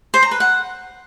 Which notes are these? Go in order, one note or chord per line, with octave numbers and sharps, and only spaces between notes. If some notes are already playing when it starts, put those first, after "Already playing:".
C5
A#5
B4
F#5